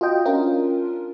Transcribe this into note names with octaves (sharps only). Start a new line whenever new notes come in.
F4 F#4 D#5 G5
C#4 D4 F4 A#4